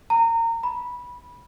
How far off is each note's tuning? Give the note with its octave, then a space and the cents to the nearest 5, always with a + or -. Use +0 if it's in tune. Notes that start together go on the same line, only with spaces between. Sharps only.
A#5 -25
B5 -15